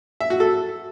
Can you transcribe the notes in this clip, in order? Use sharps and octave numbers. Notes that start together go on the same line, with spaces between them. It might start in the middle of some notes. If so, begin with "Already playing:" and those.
E5
F#4
A4